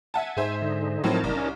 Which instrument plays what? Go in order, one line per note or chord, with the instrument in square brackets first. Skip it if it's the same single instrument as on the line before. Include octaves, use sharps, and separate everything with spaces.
[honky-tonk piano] E5 F#5 A5 [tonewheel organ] G#5
[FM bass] G#2 [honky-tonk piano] G#4 C5 E5
[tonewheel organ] D3 D#4
[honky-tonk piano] A2 F#3 C4 [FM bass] F3 [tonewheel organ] D#4 A#4 A5
[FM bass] F#1 [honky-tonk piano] C2
[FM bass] C#4